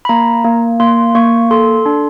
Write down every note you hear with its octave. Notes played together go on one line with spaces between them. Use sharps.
B5
A#3 A#5
A#3
A#3 C6
A#3 C#6
A4 C6
D4